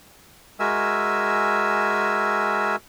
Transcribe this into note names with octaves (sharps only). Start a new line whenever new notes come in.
G#3 F#4 A#4 E5 G#5 E6